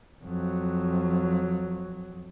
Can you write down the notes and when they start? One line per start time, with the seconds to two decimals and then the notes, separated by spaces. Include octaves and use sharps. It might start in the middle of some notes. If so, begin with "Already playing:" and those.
0.25 F2 F#3